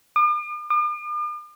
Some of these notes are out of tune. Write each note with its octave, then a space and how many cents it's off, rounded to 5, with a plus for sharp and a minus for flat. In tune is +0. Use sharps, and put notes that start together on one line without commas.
D6 +45
D6 +45